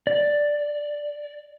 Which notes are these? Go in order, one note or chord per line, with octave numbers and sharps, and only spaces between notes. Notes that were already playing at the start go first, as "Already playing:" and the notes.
D5